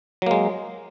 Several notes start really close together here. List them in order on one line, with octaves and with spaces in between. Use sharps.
F#3 A#3 G#3